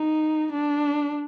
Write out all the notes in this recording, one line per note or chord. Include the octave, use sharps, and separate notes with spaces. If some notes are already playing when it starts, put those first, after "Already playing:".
Already playing: D#4
D4